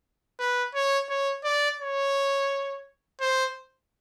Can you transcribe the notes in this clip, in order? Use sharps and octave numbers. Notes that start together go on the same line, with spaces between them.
B4
C#5
C#5
D5
C#5
C5